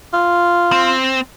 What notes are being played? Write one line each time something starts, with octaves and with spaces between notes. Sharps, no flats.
F4
C4